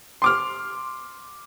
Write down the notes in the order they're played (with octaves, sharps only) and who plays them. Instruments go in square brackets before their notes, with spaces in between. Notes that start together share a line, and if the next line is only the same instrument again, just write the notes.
[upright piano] C6 D6 F6